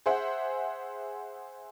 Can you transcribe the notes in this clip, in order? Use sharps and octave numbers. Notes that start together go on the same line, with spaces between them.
G#4 C5 E5 F#5